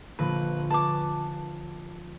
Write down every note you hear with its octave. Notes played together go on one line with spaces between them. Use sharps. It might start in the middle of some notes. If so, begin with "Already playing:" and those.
A#1 D3 F3 B4
C#4 B4 A5 D6